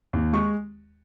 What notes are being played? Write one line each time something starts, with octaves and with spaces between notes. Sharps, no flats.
D#2
G#3 C#6